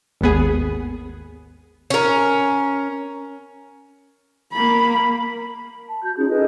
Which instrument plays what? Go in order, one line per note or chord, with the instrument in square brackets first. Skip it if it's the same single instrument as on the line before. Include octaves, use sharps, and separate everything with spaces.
[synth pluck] G#1 D#2 B3 G#4
[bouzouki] C#4 A#4
[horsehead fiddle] A#3 B5
[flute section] A5
F#4 G6
C#4 D#4 F4 G#4
G#4 A4 B4 D#5